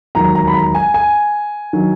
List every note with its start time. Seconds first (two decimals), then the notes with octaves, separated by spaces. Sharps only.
0.15 E1 D#2 D#3 F#3 A#5
0.35 A#5
0.47 B5
0.54 A#5
0.75 G#5
0.94 G#5
1.73 D#3 F#3